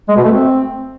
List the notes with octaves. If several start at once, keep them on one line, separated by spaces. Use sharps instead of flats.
G#3
B2
A3
C4